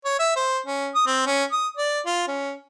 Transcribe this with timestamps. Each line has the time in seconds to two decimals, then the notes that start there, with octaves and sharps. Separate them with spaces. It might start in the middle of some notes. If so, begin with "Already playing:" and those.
0.05 C#5
0.19 E5
0.36 C5
0.66 C#4
0.95 D#6
1.07 C4
1.26 C#4
1.52 D#6
1.77 D5
2.06 F4
2.28 C#4